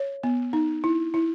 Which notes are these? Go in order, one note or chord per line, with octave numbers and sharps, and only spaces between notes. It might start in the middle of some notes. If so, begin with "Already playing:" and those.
Already playing: C#5
B3
D#4
E4
E4